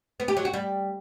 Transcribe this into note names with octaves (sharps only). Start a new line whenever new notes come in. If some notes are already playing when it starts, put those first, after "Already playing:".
B3
G4
F#3
F#4
G3